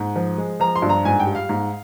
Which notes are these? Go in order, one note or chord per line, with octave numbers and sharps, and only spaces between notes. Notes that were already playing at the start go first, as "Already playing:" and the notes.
Already playing: G#2
F3
G#3
F3 A#5
C6
G2
A#5
G#2 G#5
G5
G3
F5
G#2